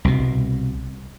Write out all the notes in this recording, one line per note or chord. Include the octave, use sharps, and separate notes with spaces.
C2 B2